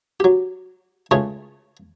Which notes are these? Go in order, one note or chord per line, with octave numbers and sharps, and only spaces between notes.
F#3 G4
C#2 C#3 A3 C#4 G#4